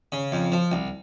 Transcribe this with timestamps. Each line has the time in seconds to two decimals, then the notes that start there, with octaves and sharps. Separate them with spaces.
0.12 C#3
0.32 F2
0.52 F3
0.72 C2